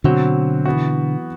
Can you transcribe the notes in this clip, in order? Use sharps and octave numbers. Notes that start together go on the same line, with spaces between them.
B2 D3 F#3 C4 F#4
E3 B3 F#4